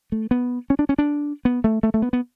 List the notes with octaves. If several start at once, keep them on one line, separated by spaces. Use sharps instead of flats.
A3
B3
C#4
D4
C#4
D4
B3
A3
A3
A3
B3
B3